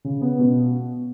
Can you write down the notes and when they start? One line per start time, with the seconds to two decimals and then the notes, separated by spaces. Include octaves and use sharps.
0.04 C#3
0.21 B3
0.39 B2